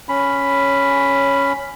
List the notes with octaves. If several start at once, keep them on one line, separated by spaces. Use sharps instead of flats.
C#4 B5